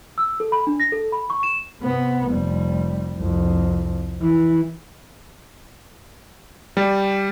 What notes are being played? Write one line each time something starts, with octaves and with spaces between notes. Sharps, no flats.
E6
A4
B5
D4
A#6
A4
B5
C#6
E7
C3 B3
F1 G3
C2 F2
E3
G3